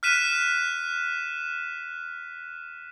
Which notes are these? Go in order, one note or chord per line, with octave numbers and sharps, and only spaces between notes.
F6 F#6 B6 D#7 E7